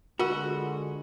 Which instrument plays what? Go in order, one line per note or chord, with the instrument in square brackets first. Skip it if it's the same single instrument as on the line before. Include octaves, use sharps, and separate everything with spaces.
[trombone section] D3 G#3 [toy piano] F4 A#4 [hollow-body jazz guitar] F#4